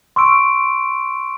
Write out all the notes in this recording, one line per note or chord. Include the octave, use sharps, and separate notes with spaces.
C6 C#6 E6 D7